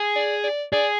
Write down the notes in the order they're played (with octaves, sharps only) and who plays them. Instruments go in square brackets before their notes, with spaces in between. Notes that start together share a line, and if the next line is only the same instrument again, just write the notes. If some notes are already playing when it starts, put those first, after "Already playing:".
Already playing: [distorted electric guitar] G#4
[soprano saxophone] D5
D5
[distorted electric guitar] G#4 [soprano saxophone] D5